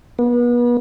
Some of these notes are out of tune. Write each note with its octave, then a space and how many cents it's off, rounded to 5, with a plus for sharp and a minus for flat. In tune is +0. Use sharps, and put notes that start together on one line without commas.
B3 -35